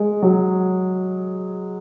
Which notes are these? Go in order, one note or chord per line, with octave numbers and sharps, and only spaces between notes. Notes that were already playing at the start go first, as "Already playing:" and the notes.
Already playing: G#3
F#3